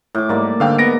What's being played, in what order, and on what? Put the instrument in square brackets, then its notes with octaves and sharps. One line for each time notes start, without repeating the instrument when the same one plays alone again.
[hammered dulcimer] A2 D6
[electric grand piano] G#2 [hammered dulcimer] G3 A#3 D5
[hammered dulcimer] G#2 [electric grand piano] D3 F5 G5
[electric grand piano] B3 A#6 D7